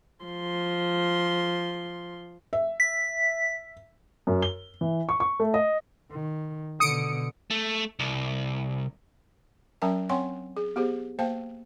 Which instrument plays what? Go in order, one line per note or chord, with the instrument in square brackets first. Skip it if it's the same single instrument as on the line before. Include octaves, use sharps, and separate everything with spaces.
[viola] F3 C6
[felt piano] E5
[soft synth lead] B6
[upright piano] F#2
G7
E3
C#6
C#6
A3
D#5
[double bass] D#3
[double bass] B2 D3 [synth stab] D#6 C#7 D7
[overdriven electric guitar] A3
C2
[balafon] F#3 C#4 A#4 E5 A5 A#5
C4 C#5 F#5 G#5 C6 C#6
G#4
B3 G4 G#4 C5
A#3 C5 F5 G5 A5